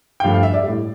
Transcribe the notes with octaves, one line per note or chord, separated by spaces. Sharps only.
G5
G2 F3 A3 F5
F5
E5
D5
G3
A2